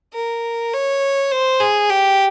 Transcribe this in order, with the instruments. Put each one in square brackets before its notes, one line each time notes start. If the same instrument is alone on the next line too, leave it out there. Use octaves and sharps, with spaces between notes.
[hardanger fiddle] A#4
C#5
C5
G#4
G4